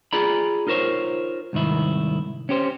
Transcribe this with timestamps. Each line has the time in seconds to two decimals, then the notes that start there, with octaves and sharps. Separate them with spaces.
0.13 F4 G#4 D5 A#5 B5
0.67 D#4 F4 A#4 C5 C#5
1.53 C2 G#2 D#3 E4
2.49 C#4 G4 C5